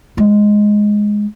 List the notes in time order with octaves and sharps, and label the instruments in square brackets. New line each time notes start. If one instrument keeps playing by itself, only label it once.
[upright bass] G#3 D#4